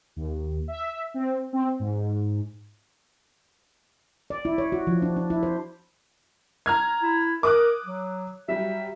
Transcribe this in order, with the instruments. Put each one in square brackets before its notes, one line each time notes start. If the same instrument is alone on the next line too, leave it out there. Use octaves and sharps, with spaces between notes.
[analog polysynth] D#2
E5
C4
C4
G#2
[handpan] D5
E4
C#5
F#4
F3
D4
D4
E4
C5
[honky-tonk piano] A#5 F6 G#6
[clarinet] E4
[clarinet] A#4 [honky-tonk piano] D6 D#6 F#6
[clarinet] F#3
[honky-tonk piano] F#3 G3 [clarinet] E5